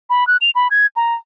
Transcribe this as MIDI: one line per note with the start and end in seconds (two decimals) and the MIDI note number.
0.10 0.26 83
0.27 0.37 90
0.41 0.50 101
0.55 0.68 83
0.71 0.87 92
0.96 1.14 82